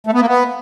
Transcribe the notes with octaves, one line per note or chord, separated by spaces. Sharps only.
A3
B3
A#3
B3